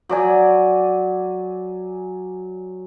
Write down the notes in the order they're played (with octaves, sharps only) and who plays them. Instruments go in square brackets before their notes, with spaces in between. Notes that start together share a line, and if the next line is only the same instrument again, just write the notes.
[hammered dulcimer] F#3 D5 G#5